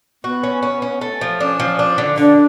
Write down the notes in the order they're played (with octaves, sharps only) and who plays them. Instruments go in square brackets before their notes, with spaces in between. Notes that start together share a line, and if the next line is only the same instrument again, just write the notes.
[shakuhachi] B3 [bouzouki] F#4
[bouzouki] C#4
C#4
C#4
A3
F3
[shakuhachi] C#4 [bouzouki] D4
[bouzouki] F3
D4
D3
[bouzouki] D3 [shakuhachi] D4